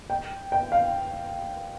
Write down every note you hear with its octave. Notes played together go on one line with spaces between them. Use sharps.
G5
G5
F5